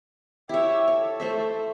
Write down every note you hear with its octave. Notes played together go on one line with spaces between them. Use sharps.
E4 G4 C#5 E5
A4 C#5
A3 C5 E5